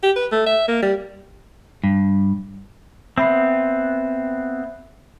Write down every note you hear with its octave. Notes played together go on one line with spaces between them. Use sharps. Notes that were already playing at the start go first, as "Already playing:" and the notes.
G4
B4
A3
E5
A#3
G3
G2
B3 C4 E5 B5 C7